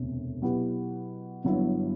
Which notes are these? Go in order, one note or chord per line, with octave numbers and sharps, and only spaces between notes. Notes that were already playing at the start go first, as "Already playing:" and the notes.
Already playing: E1 D2 C3
B2 F#3 B3 E4 G4
G1 G2 F#3 B3 E4